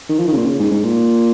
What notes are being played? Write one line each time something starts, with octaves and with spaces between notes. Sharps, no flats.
D#3
F3
D#3
C#3
A#2
C#3
G#2
G#2
A#2